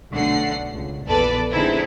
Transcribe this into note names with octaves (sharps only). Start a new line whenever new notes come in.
B1 D3 A3 F#5 C7
C#2
A#1 E2 A4 B4 D5
D3 G#3 C4 D#4 E4